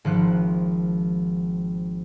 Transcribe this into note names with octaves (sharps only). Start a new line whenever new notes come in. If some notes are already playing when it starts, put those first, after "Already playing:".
G#1 F3 F#6